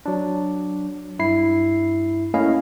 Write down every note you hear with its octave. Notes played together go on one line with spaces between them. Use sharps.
F#3 D4
G2 E4 C7
A3 A#3 C#4 E4 D#5 F5